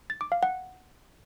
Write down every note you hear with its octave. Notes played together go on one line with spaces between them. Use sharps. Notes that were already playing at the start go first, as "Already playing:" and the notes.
A6
D6
F5
F#5